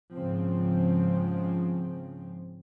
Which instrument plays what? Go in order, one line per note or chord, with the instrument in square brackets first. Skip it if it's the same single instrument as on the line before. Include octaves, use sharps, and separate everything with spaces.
[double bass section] G#2 C#3 F3 C4